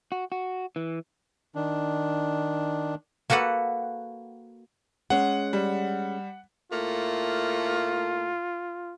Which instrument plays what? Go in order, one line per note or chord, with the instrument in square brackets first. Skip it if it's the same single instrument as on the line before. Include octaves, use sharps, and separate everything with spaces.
[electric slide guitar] F#4
F#4
E3
[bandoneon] D#3 D4
[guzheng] A#3 F#4 A4 B4 F#5
[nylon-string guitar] G#3 C#4 [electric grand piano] F#5
[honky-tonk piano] G3
[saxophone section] A2 A3 A#3 [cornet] F4